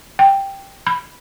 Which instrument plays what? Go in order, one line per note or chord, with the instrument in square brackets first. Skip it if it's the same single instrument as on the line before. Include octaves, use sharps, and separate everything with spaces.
[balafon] G5
B5